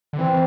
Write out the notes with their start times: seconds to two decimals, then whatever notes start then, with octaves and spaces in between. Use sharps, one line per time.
0.13 D3
0.18 E3 C4